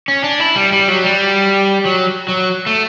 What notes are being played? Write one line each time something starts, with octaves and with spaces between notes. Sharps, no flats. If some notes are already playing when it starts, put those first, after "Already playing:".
C#4
D4
E4
G3
G3
F#3
G3
F#3
F#3
A3